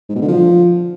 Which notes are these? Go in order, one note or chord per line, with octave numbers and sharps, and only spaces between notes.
G#2
B2
D3
F3